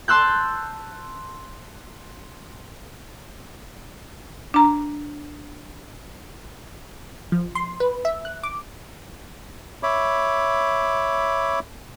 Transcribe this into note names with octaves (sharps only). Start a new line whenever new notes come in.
A5 C6 E6 F#6 G6
D4 A#5
F3
C6
B4
E5
F#6
D6
C#5 E5 B5 D6